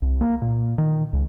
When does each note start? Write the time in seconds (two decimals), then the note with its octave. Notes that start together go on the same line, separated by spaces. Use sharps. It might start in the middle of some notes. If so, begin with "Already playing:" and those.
0.02 C2
0.21 A#3
0.42 A#2
0.78 D#3
1.13 C#2